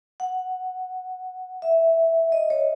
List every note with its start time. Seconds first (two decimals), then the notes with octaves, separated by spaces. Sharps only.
0.20 F#5
1.62 E5
2.32 D#5
2.50 C#5